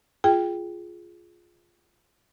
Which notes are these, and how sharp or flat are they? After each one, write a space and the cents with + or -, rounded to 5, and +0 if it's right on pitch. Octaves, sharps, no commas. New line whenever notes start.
F4 +0 G#4 +0 G5 +5